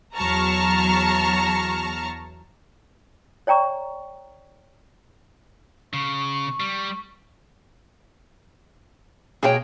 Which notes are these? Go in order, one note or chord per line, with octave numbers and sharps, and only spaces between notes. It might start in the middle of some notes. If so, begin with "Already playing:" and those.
E2 F#3 A5 A#5 C#6 F6
C#5 D5 G5 A#5 C#6
C#3 C#6
G3
B2 A#3 G#4 C#5 G5